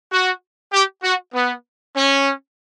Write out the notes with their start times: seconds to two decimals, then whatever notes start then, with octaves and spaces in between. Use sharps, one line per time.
0.12 F#4
0.73 G4
1.03 F#4
1.34 B3
1.95 C#4